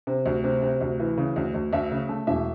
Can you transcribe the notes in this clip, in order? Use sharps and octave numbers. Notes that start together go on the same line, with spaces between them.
C3
D2
C3
C3
D2
E3
C#3
D2
D2
D2 E5
C#3
A3
E1 E5